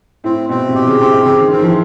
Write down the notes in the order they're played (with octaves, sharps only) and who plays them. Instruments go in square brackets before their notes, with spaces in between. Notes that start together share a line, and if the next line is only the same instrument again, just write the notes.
[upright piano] A2 [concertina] C4
[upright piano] B2 [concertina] C4
[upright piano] C3
[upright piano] B2 [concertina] G4
[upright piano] C#3
[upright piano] C3 [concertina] C4
[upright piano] C3
[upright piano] C#3 [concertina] C4
[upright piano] D#3
[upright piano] D#3 [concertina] C4
[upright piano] F3
E3